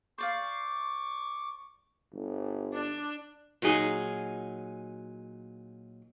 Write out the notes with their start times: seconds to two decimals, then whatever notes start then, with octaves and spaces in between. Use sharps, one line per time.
0.18 C5 D5 F5 C#6 D6
2.13 G1
2.74 D4
3.62 A#2 F#3 D#4 G#4